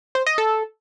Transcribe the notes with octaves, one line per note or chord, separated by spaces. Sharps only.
C5
D#5
A4